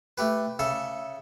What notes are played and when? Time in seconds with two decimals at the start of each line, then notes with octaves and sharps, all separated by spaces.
0.18 A3 G4 B4
0.59 C#3 A4 E5